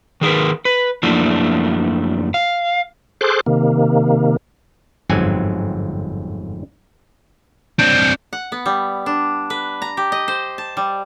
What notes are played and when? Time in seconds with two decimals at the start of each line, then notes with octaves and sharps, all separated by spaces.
0.21 D#3 G#4 A#4 B4
0.65 B4
1.03 F#2 F3 A3 A#3 D4 E4
2.34 F5
3.21 G#4 A4 C5 C6 D6 F#6
3.46 C3 D#3 A#3
5.10 G1 F2 G#2 F#3 C4 G#5
7.79 C4 D4 G6
8.33 F#5
8.52 B3
8.66 G3
9.06 D4
9.50 B4
9.82 A#5
9.97 G4
10.12 D#5
10.28 C5
10.58 A5
10.77 G3